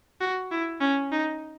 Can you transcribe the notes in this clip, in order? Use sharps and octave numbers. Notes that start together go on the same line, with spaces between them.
F#4
E4
C#4
D#4